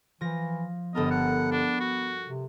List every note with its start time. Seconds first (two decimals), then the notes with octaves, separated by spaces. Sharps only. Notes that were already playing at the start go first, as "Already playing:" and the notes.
0.21 E3 F3 A#6
0.95 G1 B3 A4 A#4 D#5
1.11 F#5
1.52 D4 F#5
1.80 F#4
2.26 C3